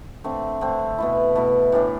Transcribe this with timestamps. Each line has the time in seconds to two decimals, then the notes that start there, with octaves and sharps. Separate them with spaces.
0.24 D3 A3 C4
0.61 D3 A3 C4
0.98 B2 A3 E4
1.35 B2 A3 E4
1.72 A2 E3 A3 D4